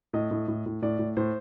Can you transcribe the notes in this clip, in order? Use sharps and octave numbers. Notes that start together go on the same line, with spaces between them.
A2 D#5
A2
A2
A2
A2 D5
A2
A2 C5